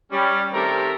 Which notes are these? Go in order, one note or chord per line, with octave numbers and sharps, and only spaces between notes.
G3 C#4
D#3 A3 C4 G4 A4 A#4